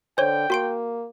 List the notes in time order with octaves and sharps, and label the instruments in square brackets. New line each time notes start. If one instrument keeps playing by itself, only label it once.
[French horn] D3 [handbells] C5 C#5 [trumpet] G5
[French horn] A#3 [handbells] F#4 C6 D7